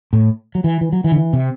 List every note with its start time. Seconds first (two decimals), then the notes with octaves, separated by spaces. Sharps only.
0.13 A2
0.55 F#3
0.64 E3
0.81 E3
0.93 F#3
1.04 E3
1.12 D3
1.16 E3
1.33 C3